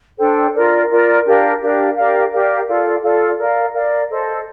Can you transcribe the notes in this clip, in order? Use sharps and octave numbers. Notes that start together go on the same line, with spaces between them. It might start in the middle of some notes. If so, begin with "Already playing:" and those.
D4 A4 C5 G5
F4 A#4 D5
F4 A#4 D5
D4 G4 A#4 F5
D4 G4 A#4 F5
G4 A#4 D5 F5
G4 A#4 D5 F5
F4 A4 D5 F5
F4 A4 D5 F5
A#4 D5 F5
A#4 D5 F5
A4 C5 D#5